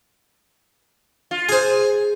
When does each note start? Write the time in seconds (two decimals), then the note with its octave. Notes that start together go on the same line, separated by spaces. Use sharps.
1.31 F4
1.49 G#4 C5 G#5